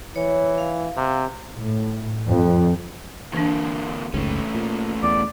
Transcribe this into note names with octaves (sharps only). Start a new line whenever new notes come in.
E3 C#5
F5
C3
A2
F2
A#2 D3 E3 A#3 D4
F#1 C#2 G#2 A3 C#4
A#2
E2 D5